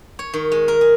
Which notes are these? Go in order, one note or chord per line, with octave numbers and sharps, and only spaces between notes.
C#5
D#3
G#3
A#4
G#4